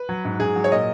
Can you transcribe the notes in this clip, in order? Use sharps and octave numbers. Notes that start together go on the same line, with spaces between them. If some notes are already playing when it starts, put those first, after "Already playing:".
Already playing: B4
F#3
G#2
G#2 G#4
F#3
C#5
A#2 D#5